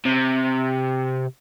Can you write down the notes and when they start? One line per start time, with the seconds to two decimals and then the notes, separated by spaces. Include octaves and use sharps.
0.05 C3